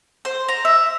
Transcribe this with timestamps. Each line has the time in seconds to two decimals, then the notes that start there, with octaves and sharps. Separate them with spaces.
0.25 C5
0.48 A#5
0.65 E5